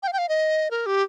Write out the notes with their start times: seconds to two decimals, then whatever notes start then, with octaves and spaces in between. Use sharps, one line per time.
0.03 G5
0.08 F5
0.13 G5
0.18 F5
0.29 D#5
0.71 A#4
0.86 G4